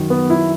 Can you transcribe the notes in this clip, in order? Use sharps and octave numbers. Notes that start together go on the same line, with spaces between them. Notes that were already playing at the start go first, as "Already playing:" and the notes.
Already playing: F#2 D#3 F#3
B3
E4